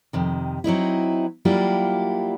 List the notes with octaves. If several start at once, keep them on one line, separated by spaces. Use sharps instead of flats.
F2 C3 D#3
F#3 C4 D#4 E4
F#3 G3 A#3 E4 F4 G4